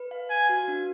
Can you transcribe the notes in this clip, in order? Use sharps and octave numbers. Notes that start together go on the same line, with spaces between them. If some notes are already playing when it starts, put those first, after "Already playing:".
Already playing: B4
F5
F5 G#5
F#4
D4